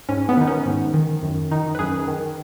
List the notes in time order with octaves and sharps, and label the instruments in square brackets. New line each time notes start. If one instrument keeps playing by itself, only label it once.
[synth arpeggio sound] G#2 C#4
B3
D#3 D#4
C#4
G#2
D#3
F#2
D#3 D#4
B4
F#2 G#4
D#3